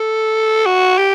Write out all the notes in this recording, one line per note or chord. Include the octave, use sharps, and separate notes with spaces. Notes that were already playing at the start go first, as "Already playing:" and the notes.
Already playing: A4
F#4
G4